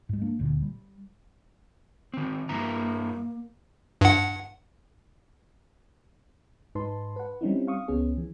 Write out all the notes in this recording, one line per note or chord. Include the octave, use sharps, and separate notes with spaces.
G#2 G#3
A#3 D4
D#1 D2 A#2 D3
G3
D#3 C4
G2 A#3 E4 A#5
G2 F#5
G#2 D#4 B4 A5 C6
B4 F#5
G3 C4 C#4 D#4 E4
F5 C#6 D#6
C#2 B3 C#4 G#4
E3